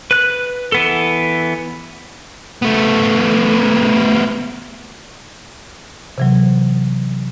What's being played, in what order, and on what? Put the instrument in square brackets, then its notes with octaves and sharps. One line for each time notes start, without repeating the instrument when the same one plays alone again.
[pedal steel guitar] B4 F#6
E3 B3 A4
[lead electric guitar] A3 B3
[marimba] C3 E3 F#3